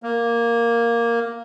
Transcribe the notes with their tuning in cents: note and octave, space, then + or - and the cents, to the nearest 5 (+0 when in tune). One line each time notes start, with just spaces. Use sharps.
A#3 +0